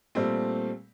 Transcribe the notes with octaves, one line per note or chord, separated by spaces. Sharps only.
A#2 G3 A3 C4